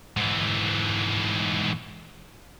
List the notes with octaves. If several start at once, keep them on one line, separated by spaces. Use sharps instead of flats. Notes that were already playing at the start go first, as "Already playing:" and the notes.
G#2 E3